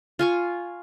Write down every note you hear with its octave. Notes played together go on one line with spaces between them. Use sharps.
F4 G#5 C#6